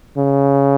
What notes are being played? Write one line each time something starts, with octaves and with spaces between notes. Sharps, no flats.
C#3